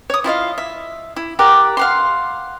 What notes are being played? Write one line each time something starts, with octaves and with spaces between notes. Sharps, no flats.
C#5 D#6
E4 F4 D#5 F5
E5
E4
G4 A#4 D5 F#5
F5 F#5 C6